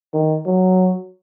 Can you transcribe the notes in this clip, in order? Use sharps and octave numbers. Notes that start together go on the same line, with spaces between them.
D#3
F#3